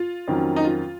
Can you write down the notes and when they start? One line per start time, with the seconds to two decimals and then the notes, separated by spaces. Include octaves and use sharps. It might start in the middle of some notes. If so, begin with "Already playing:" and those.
Already playing: F4
0.28 F2 D#3 F#3 A#3 C#4
0.56 D#4
0.64 F4